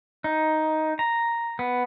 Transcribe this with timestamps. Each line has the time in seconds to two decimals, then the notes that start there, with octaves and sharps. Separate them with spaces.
0.24 D#4
0.99 A#5
1.59 B3